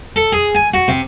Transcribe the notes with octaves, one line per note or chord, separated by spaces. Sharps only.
A4
G#4
G#5
F#4
C3